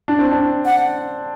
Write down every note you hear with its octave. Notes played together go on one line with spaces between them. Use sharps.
D4
C4
D4
F#5